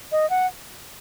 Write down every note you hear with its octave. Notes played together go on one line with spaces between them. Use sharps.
D#5
F#5